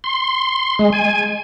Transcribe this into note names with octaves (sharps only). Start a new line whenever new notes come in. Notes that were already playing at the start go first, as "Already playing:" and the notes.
C6
G#3
G#5